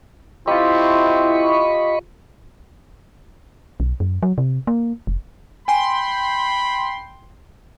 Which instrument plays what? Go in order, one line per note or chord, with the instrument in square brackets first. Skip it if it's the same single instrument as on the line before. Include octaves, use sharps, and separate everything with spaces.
[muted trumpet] C4 [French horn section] E4 [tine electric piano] F4 G4 [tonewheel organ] D#5 B5 C#6
[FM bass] B1
F#2
F#3
C3
A#3
F1
[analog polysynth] G5 C6 [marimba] G#5 [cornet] B5